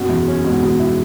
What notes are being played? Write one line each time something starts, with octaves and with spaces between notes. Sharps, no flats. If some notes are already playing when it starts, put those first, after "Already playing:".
Already playing: F#2 B2
E2 E4
C#4
G#2 B2
B2
E4